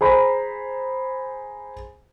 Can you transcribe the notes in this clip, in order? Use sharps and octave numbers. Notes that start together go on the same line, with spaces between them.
G#4 C5 A#5 B5